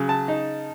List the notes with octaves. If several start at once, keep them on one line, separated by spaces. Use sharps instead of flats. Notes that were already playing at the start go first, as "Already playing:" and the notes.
Already playing: C#3 F#3
A5
D#4